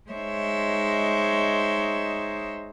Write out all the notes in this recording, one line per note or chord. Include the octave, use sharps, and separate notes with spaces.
G#3 D#4 C5 C#5 E5